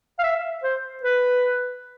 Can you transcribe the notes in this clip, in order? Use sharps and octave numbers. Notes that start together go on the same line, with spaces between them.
F5
E5
C5
B4